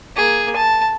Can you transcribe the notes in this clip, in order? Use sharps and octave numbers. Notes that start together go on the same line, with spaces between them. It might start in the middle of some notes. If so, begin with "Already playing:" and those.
A#3 G#4
A5